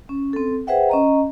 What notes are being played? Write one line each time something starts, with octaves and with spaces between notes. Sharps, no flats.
C#4
C4 A4
G#4 B4 C5 E5 F#5 G5
C#4 D#5 A#5